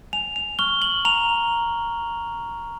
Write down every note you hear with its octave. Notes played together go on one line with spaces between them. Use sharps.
G#5 F7
F7
C#6 F6 G7
F#7
A#5 F7